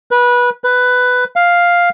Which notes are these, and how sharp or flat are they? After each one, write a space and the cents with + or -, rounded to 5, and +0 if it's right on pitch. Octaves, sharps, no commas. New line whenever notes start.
B4 -20
B4 +10
F5 +5